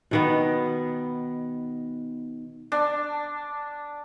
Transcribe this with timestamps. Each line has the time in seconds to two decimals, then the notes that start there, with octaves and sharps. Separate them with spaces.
0.11 B2 D#3 B3
2.72 D4